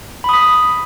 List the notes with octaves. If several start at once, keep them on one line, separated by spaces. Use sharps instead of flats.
B5 D#6 B6